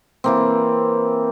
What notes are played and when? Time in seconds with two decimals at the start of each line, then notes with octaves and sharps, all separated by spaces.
0.24 E3 A#3 C4